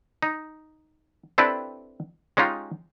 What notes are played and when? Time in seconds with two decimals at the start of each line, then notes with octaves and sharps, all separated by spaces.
0.22 D#4
1.38 C4 D4 E4 G4 A4 B4
2.37 G#3 C#4 D#4 F4 G4